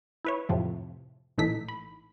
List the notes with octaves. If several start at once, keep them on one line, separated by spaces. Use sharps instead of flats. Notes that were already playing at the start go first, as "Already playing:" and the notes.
E4 B4 C#5
F2 A2 C3 F3
A#1 A2 E3 D#4 A4 B6
B5